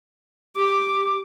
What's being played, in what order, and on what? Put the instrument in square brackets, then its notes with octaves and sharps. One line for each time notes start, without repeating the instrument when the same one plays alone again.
[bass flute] G4 [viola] D6